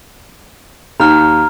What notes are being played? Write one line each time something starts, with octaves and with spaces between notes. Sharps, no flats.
D#2 A#5 F6